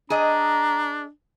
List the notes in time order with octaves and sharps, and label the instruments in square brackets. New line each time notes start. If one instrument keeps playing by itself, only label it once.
[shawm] D4 [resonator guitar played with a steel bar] G#4 D#5 [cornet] A#5